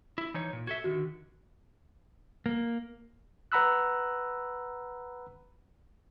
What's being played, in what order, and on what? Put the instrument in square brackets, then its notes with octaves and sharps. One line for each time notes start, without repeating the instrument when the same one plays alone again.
[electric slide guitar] E4
E3 D#4 C#5
A#2
[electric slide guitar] F#4 A4 E5 [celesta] G#6
[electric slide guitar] D3 D#3 [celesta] F#4
[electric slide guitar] A#3
[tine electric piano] B4 F#5 A#5 B5 E6 F#6